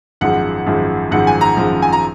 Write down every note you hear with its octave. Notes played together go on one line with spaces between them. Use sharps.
G#1 F#2 F3 G#3 F#5
G#1 F#2 F3 G#3
G#1 F#2 F3 G#3 F#5
G#5
A#5
G#1 F#2 F3 G#3
G#5
A#5